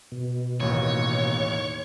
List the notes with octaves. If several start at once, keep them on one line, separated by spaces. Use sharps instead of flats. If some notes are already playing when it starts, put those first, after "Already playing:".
B2
A1 D#2 A#3 C#5